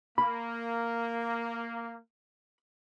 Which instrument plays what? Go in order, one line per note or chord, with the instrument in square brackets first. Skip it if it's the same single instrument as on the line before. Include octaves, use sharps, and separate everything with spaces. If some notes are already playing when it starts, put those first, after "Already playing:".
[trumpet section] A#3 [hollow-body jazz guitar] B5